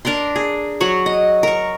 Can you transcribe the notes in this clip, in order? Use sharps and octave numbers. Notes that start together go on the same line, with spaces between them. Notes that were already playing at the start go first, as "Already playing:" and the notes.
D4 A#4 A#5 C6
G#4
F#3 F#4 C#5
D#5
A#4 C#6